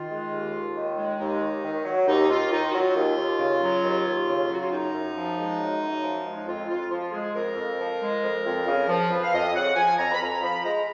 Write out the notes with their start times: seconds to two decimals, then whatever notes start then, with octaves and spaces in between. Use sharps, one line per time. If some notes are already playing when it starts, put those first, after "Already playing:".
Already playing: D#3 F4
0.10 G#3
0.31 D#2
0.54 D#2
0.75 D#3
0.97 G#3
1.19 D#2 D#4
1.41 D#2
1.63 D#3
1.84 F#3
2.06 D#2 D#4
2.29 D#2 F4
2.51 D#3 D#4
2.68 F#4
2.73 F#3 F4
2.95 D#2
3.17 D#2
3.38 C#3
3.61 F#3
3.83 D#2
4.05 D#2
4.27 C#3
4.49 F#3 F#4
4.60 F4
4.70 F#2 D#4
4.93 F#2
5.15 F3
5.37 G#3
5.59 F#2
5.81 F#2
6.02 F3
6.24 G#3
6.36 D#4
6.46 F2 F4
6.68 F2 F4
6.90 F3 F4
7.12 G#3 G#4
7.34 F2 A#4
7.56 F2
7.78 F3
8.01 G#3
8.22 F2
8.45 F2
8.67 C#3
8.88 F3
9.10 F2 B4
9.22 F5
9.32 F2 D#5
9.54 C#3 F#5
9.76 F3 G#5
9.98 F2 A#5
10.12 B5
10.20 F2 A#5
10.42 F3 B5
10.64 G#3 A#5